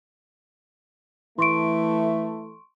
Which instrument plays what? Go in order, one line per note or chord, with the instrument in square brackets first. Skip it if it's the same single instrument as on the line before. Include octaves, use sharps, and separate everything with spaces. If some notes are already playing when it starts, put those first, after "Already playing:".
[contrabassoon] E3 [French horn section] A3 [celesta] C6 C#6 D7